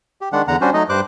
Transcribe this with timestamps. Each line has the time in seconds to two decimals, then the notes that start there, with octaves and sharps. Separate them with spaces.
0.21 G4
0.32 D#3 G#3 D4 F#5
0.48 E2 D3 F#5 A#5
0.61 G3 C#4 D4 F#4 C5
0.74 F#3 A3 D#4 D#5
0.89 G2 G3 C5 D6 F#6